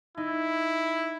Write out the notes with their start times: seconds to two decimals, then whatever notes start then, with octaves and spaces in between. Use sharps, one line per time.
0.17 D#4 E4